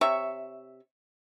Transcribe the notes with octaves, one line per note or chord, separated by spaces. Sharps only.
C3 C#5 E5 C#6